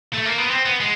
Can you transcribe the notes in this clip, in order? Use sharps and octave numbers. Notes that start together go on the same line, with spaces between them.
A3
A#3
B3
C4
B3
G#3